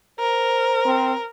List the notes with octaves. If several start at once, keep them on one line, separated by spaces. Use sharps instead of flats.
A#4 C5
C4